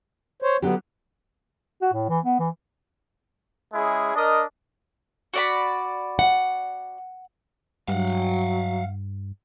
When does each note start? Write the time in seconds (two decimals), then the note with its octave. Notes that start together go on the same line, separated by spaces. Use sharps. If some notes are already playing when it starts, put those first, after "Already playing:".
0.42 C5 C#5
0.62 D3 F#3 B3 G4
1.82 F#4
1.93 A2
2.09 E3
2.25 B3
2.39 E3
3.74 G#3 C#4 E4 G#4
4.15 D4 A#4 D#5
5.34 F#4 D5 B5
6.19 F#5
7.88 G2 F#3 F5 F#5